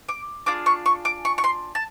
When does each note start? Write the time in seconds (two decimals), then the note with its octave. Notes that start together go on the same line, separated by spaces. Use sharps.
0.09 D6
0.46 D4 F4 G#4 D6
0.66 C#6
0.86 C#6
1.05 D6
1.25 C#6
1.38 C#6
1.44 C6
1.75 A5